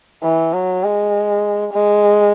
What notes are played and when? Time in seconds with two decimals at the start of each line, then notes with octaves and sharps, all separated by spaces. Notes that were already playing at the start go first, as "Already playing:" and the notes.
0.23 E3
0.53 F#3
0.83 G#3
1.73 G#3